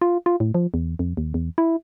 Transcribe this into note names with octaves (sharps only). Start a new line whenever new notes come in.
F4
F4
A2
F3
E2
F2
D#2
E2
E4